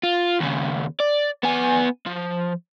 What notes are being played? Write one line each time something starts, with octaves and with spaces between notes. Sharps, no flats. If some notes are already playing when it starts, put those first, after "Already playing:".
F4
D#2 C#3
D5
B3 G#5
F3